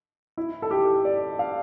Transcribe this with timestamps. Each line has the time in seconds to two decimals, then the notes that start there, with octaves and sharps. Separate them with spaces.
0.37 E4
0.62 A4
0.71 G4
1.05 D5
1.39 F5